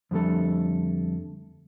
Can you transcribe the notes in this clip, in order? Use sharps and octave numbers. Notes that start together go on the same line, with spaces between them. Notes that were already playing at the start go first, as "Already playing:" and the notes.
F2 D3 G3 A3 A4